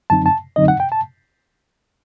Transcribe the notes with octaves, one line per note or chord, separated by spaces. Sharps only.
F#2 D3 F#3 C4 D#4 A5
A5
F#2 D3 F#3 C4 D#4 D#5
F#5
G5
A5